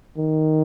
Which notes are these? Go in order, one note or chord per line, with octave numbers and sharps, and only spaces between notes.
D#3